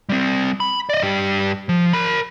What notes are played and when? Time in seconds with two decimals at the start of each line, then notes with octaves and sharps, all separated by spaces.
0.09 G3 C4
0.60 B5
0.90 D5 D#5
1.02 G2 G4
1.69 F3
1.93 A#4 B5